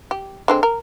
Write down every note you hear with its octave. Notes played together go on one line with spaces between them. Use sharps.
G4
D3 G#3 C4
A#4